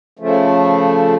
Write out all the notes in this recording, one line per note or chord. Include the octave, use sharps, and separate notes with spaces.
C#3 F3 A3